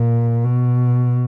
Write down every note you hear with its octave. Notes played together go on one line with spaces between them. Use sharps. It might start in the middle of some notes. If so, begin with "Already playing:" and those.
Already playing: A#2
B2